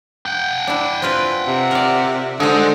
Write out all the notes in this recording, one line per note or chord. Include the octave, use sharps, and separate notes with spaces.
F#5 G5
D4 E4
C4 F4 B4
C3
A#4 D5
D3 G#3 D#4 C5